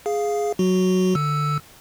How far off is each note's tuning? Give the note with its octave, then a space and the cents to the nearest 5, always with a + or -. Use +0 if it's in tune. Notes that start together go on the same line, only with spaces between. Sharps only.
G#4 +0 F5 +0
F#3 +0 F#4 +0
D3 +15 E6 +0